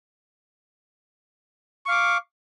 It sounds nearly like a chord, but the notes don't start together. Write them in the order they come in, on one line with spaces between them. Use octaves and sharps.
C#6 F5 D6